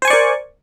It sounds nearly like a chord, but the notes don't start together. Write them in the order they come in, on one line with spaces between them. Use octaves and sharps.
C5 G#5 C#6 D5 A#4